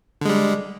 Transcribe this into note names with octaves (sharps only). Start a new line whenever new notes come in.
D3 G3 G#3